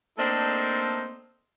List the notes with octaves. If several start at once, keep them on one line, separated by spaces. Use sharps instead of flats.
A3 A#3 C4 D4 D#4 A4